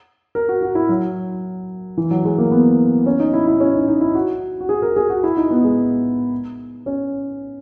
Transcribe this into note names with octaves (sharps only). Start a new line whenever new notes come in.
A#4
F#4
F#4
E4
F#3
E3
F#3
G#3
A#3
B3
C#4
D#4
E4
E4
C#4
D#4
D#4
E4
F#4
F#4
G#4
A#4
G#4
F#4
E4
D#4
B3
G#3
C#4